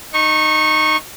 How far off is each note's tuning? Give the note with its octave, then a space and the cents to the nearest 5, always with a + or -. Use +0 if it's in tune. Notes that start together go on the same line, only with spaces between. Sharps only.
D#4 -15 C#6 -20